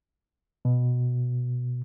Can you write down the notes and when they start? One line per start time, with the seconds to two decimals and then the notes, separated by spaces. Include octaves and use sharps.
0.65 B2